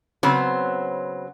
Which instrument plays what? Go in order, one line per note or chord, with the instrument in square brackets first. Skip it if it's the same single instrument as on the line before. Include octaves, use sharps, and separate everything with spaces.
[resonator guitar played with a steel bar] C#3 F#3 B3 C4 C5